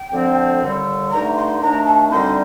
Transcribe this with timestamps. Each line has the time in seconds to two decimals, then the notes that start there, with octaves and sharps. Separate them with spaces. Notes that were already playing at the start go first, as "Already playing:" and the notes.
Already playing: G5
0.11 D2 D3 F3 C4
0.61 D#2 D3 G3
1.11 G2 D3 A3 D#4 A#5
1.36 C6
1.61 D#2 D#3 A3 D4 A#5
1.86 A5
2.10 D2 D3 G3 C4 D#4 C6